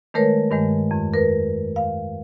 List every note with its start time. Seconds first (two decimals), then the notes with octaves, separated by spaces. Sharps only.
0.14 D#3 G#3 A3 A#4 B4 C#5
0.51 G2 D#3 G#3
0.91 F2
1.14 A#4 B4
1.76 F5